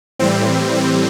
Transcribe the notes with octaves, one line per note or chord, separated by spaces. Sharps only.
A2 E3 G3 C4
C4